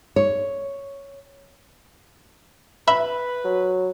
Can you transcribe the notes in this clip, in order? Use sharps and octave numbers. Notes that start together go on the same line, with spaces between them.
C#5
B4 E5 B5
F#3